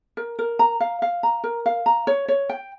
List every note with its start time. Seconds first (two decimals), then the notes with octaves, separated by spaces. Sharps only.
0.17 A#4
0.39 A#4
0.59 A#5
0.80 F5
1.02 F5
1.23 A#5
1.44 A#4
1.66 F5
1.86 A#5
2.07 C#5
2.28 C#5
2.49 G5